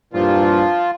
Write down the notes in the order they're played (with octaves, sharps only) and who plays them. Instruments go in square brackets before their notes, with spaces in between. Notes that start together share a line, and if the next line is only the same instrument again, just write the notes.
[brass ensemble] C2 G2 A#2 [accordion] F3 F4